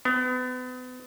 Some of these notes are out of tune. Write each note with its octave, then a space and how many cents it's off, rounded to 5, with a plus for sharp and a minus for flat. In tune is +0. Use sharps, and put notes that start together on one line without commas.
B3 +35